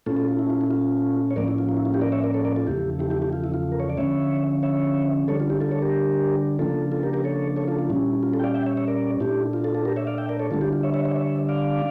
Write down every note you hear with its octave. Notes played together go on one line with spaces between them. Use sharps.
A#2 A3 C#4 F4 A4
F4 A4
F4
E4
F4
E4
F4
C#5
A2 F3 A#3 C#4 A#4 D5
E4
F4
F4
E4
F4
E4 G4
A#4 D5
C#5 E5
A#4 D5
A4 C#5
A#4 D5
F4 A4
E2 C#3 F3 A3 E4 G4
E4 G4
E4 G4
E4 G4
F4
E4
F4
A#4
C#5
D5
D3 F3 C#4 C#5 E5
C#5 E5
D3 G3 D4 A4 C#5
F4
E4 G4
F4 A4
A4 C#5
G4 A#4
C#3 F3 A#3 D4 F4 A4
F4 A4
G4 A#4
G4 A#4
A4 C#5
A4 C#5
F4 A4
F4
A#2 G3 C#4 E4
F4
F4 A4
G5
D5 F5
E5 G5
C#5 E5
C#5 E5
A#4 D5
A#2 A3 D4 E4 G4
F4
F4 A4
F4 A4
G4 A#4
C#5 E5
D5 F5
E5 G5
A#4 D5
A4 C#5
D3 G3 D4 F4 A4
E4 G4
F4
C#5 E5
C#5 E5
C#5 E5
C#5 E5
D5 F5